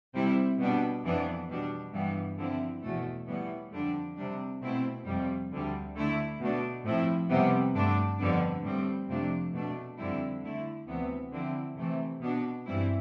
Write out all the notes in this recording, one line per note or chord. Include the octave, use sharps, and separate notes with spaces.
C3 G3 C4 E4
B2 G3 B3 D4
F2 E3 B3 D4
B2 G3 D4
G2 E3 G3 B3
D3 F3 C4 E4
E2 B2 A3
A2 E3 G3 B3
F2 D3 G3 D4
C3 G3 D4
B2 A3 C4 E4
F2 C3 G3
D2 D3 G3
D3 A3 E4
B2 A3 D4
A2 F3 C4 E4
F2 C3 G3 B3
G2 D3 A3 D4
F2 D3 G3 B3 D4
A2 G3 C4
F2 C3 F3 A3 D4
B2 A3 D4
F2 D3 G3 C4 E4
D3 A3 E4
D2 C3 E3 B3
D3 F3 C4 E4
C3 E3 A3 C4
B2 B3 D4
G2 E3 G3 C4 E4